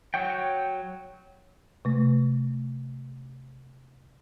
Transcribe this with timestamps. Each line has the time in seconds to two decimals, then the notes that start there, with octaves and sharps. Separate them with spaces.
0.14 F#3 C#5 F#5 G5
1.85 C3 A3